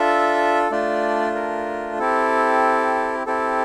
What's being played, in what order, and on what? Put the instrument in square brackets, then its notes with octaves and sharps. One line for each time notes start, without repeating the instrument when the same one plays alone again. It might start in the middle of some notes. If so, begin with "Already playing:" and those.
Already playing: [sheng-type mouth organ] D4 F4 A4 E5
A3 D4 F4 D5
A#4
C4 E4 G4 A4
C4 E4 G4 A4